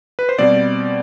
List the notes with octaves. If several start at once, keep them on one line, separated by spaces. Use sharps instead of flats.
B4
C5
B2 G3 C4 D5